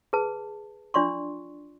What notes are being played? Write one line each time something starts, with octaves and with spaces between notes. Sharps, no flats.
G#4 B4 A5
D4 F4 D5 C6 C#6